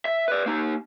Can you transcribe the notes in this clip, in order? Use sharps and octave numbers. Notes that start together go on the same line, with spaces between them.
E5
B4 D5
A#3 D#4